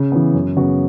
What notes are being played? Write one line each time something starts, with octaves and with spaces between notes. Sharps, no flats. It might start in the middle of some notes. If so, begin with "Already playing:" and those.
Already playing: C#3
E3 B3
F#2
C#3 F#3 B3 F#4